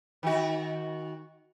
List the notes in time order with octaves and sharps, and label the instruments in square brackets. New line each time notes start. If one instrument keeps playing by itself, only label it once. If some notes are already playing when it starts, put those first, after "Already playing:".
[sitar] D#3 F#4